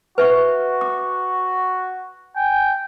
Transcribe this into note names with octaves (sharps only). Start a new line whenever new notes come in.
F#4 B4 E5 C#6
D6
G5 G#5